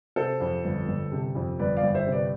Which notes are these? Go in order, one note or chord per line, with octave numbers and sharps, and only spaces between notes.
C3 A4 C5
F2
G1
G1
C3
F2
G1 B4 D5
D5 F5
G1
C5 E5
C3
B4 D5